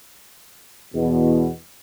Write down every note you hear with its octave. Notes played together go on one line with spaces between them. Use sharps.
E2 B2